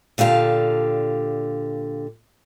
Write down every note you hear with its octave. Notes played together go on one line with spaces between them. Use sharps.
A#2 D3 G4 F5 A5